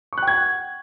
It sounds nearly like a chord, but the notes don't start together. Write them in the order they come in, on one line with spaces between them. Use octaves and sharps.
C#6 F#6 G5 G#6 F#5